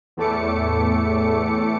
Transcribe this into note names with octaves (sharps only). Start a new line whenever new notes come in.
E2 A2 A3 D6 C#7